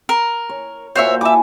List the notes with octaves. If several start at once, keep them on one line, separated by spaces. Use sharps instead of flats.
A#4
C#5
A#2 F#4 C5 C#5 E5
E4 E5 G#5 A5 D6